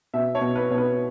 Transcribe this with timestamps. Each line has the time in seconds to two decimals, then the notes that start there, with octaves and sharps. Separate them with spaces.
0.14 B2 E5
0.35 C#5
0.41 B2
0.55 B4
0.70 B2 C#5
0.78 B4